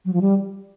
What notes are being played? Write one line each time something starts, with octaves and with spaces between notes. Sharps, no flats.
F#3
F3
G3